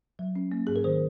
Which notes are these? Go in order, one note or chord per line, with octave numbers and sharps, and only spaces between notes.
F#3
C#4
A#3
G#2 G#4
A#4
D#3 C5